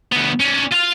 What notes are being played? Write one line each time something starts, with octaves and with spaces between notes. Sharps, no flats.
D2 B3
C#4 D5
F4 F5